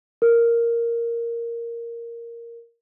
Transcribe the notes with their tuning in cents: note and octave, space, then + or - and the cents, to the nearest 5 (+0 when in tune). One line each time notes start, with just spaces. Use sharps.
A#4 +0